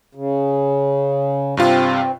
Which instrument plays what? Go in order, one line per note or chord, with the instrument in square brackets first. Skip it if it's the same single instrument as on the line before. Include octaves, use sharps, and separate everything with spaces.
[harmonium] C#3
[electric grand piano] G2 C3 F4 [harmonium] C4